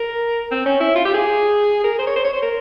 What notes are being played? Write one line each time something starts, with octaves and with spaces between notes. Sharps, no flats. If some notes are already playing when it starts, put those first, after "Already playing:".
Already playing: A#4
C4
C#4
E4
F4
G4
G#4
A#4
C5
C#5
C5
C#5
C5
A#4